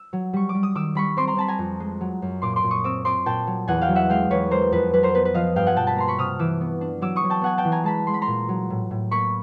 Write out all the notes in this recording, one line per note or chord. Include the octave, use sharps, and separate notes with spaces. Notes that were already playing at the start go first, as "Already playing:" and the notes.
Already playing: E6
F#3
G3 C#6
D6
G3
D#6
D#3 D6 E6
G3 B5 C#6
C4 C6 D6
A#5 C6
C4 A5 B5
G#5 A#5
F2
G#3
F#3
F#2
A#2 C6 D6
C6 D6
A#2
C#6 D#6
C4 D6 E6
C4 C6 D6
A#2 G5 A5
F#3
E2 F#5 G#5
F5 G5
F#3
E5 F#5
G#3 F5 G5
E2 B4 C#5
G#3 A#4 C5
F2 B4
F#3 B4
A#4 C5
B3 B4
B4
F3 D#5 F5
G2 F5 G5
F#5 G#5
B2 G5 A5
A5 B5
A#3 A#5 C6
B5 C#6
C3 D#6 F6
E3 D6 E6
B3
D4
F#3 D6 E6
C#6 D#6
F#3
G5 A5
B3 F#5 G#5
G5 A5
E3
G#5 A#5
G#3 A5 B5
G#3 C6
B5
A#5 C6
A#2
F#3
A2
A2
A#3 B5 C#6